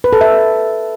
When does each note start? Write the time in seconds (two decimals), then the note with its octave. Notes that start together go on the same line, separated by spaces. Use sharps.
0.04 B4
0.13 A4
0.21 E5